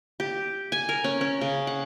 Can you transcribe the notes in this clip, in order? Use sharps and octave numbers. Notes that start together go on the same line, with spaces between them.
G4
G#5
A#4
C#4
C#4
C#3
F#5